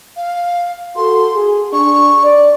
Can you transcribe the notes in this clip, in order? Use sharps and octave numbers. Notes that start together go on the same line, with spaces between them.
F5
F#4 A4 C6
G#4
D4 G#4 C#6
D5